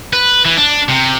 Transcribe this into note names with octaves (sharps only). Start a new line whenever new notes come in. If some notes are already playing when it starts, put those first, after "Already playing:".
B4
E3
D4
C3